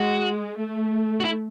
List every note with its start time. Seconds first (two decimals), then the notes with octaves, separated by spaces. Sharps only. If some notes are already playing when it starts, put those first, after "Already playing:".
Already playing: G#3 F#4
0.57 A3
1.20 F#4
1.24 E4